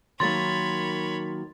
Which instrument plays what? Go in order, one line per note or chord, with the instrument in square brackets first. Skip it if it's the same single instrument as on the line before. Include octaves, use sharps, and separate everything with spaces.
[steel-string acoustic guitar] D#3 F#3 A#3 [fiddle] C#5 B5 [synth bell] C6 A6